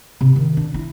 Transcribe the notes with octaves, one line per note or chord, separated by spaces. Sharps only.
C3
D#3
D4
E4